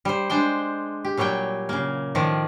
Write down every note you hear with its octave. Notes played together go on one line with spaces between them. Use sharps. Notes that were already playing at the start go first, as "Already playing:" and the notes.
G3 C5
G#3 D4 C5 G5
G4
A#2 F#3 G3 C#5 G5
C#3 A#3
A2 D#3 F3 D5